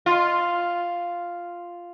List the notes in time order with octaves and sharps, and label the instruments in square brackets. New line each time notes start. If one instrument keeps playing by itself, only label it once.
[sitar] F4